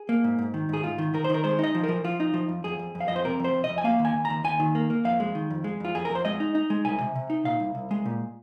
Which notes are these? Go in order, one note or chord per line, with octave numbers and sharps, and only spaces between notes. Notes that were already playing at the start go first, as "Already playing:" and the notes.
Already playing: G#4
A#3
G#2
G#2
D#3
G#2 G#4
G#2 F4
D#3
D#3 A#4
C5
D#3 A#4
G#3 C5
D#4 D#5
F3
A#4
F3
F3 F4
D#4
F3
F2
F2 G#4
F2
F2
F5
F2 D#5
C5
C3 A#4
F2 C5
F2
D#5
F2
G#5
A#3 F5
D#2
G#5
D#2
A#5
D#2
D#2 G#5
D#3
A#3
A#3
F2 F5
G#3
D#3
F2
G#3
F2 F4
F2 G#4
A#4
F2
C5
G#3 D#5
D#4
D#4
G#3
C2 G#5
C3
C3
D#4
A#2 F5
C2
C2
G#3
A#2